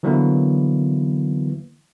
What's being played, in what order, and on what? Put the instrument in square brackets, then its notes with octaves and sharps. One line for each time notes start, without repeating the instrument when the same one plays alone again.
[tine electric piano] D3 E3 F#3 A#3 B3 E4